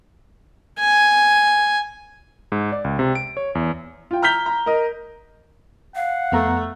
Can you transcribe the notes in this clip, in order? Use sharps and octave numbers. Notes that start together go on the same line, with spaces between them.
G#5
G#2
D5
C#2
C3
D7
C#5
E2
F4 G5
A#5 F6 G6 B6 G7
A#5
A#4 D#5
F5 F#5
F2 A3 B3 A#5